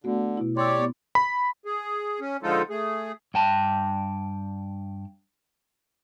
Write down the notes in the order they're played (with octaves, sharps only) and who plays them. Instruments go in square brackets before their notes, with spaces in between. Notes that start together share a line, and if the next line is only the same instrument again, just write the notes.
[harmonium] D3 [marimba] A3 B3 F#4
[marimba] B2 E4
[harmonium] G4 C#5 D5 [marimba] C6 E6
[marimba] B3
[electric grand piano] B5
[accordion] G#4
C#4
D3 F3 G#3 D#4 F4 A4
A3 G#4
[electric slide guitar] G2 G5 A5